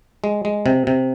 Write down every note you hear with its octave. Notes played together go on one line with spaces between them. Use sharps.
G#3
G#3
C3
C3